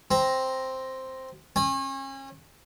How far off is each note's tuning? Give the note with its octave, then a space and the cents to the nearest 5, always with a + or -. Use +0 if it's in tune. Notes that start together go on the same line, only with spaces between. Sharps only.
C4 +0 A#5 +0
C#4 -35 G#5 -30